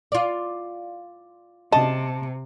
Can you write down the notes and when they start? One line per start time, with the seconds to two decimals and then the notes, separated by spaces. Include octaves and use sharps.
0.12 F4 D5
1.72 C3 D#5 A5